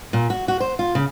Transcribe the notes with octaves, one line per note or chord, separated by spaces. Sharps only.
A#2
F#4
F#4
C5
F4
C#3